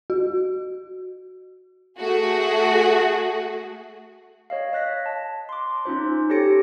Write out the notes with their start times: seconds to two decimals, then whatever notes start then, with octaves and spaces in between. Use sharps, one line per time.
0.10 F#4
2.00 A3 F#4 G#4
4.50 C#5 D#5 F5
4.73 D#5 F#6 A#6 B6
5.06 A5
5.49 C6 D6
5.85 C#4 D#4 F4 C5
6.30 G4 A4 C#5 A#6 C#7 D7